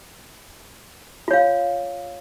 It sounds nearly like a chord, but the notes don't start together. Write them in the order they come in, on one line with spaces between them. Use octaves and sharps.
F4 C#5 F5